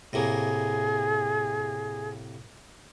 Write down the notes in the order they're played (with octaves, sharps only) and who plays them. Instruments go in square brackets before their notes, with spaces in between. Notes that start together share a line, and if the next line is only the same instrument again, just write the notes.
[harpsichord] A2 C3 A#3 [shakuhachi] G#4